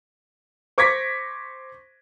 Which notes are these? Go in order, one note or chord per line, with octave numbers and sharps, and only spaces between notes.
C5 C#6 D6 G#6 A#6 B6